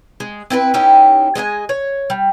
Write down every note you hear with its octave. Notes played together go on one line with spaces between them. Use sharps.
G#3
C4 E4 G#4 B4
C#4 D#4 E4 G4
G#3 D#5 E5 G#5
C#5
G3